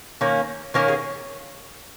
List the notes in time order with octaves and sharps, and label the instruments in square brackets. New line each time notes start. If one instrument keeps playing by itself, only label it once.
[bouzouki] D#3 A#3 C#4
D#3 A#3 C#4 A#4 C#5
G#4